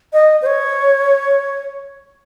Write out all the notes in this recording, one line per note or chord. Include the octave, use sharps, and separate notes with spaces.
D#5
C5
C#5